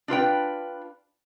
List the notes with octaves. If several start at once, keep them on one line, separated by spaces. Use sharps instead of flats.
D4 F4 B4 G5